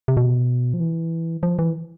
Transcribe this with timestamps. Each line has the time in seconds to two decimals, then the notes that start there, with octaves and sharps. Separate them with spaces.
0.08 C3
0.17 B2
0.74 F3
0.80 E3
1.43 F3
1.59 E3